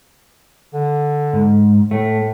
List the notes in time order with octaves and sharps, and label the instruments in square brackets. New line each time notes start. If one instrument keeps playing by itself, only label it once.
[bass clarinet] D3
[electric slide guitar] G#2
[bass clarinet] A2 [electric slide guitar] A3